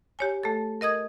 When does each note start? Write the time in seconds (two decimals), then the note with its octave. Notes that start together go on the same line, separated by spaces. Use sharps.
0.19 G4 C#5 G#5
0.43 A3 A4
0.81 A#4 D#5 D#6 G#6